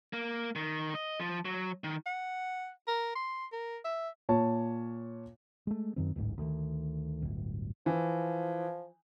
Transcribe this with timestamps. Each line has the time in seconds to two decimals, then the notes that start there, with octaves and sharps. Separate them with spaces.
0.13 A#3
0.55 D#3
0.95 D#5
1.20 F3
1.45 F#3
1.84 D#3
2.06 F#5
2.88 A#4
3.16 C6
3.52 A#4
3.85 E5
4.29 A#2 C#5 A5
5.67 G#3 A3
5.96 F#2 D#3 C4
6.16 D1 A1 G#2
6.38 D2 D#3
7.22 D1 G1
7.86 E3 F3